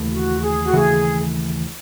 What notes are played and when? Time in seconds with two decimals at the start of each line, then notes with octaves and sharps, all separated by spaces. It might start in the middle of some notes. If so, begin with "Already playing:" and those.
Already playing: D#2 C#3 E3 A3
0.11 F#4
0.42 G#4
0.63 F#4
0.73 D#2 C#3 E3 A3 G#4